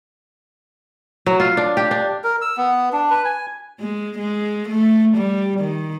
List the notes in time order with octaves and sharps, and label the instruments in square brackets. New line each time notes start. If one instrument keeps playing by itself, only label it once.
[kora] F#3
F4
D4
G4
D4
[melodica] A#4
E6
B3
D4
B4
G#5
[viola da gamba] G#3
G#3
A3
G3
D#3